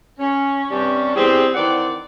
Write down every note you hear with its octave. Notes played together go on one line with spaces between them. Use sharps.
C#4
G2 C3 G3 C#4 D4 G4
E2 E3 G3 C4 G4 G#4
D#3 E3 C4 D5 F#5